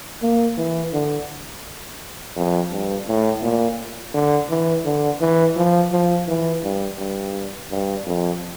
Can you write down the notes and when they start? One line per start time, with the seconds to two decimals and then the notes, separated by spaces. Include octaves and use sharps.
0.22 A#3
0.58 E3
0.93 D3
2.36 F2
2.71 G2
3.08 A2
3.42 A#2
4.14 D3
4.50 E3
4.85 D3
5.21 E3
5.56 F3
5.92 F3
6.28 E3
6.64 G2
6.99 G2
7.71 G2
8.06 F2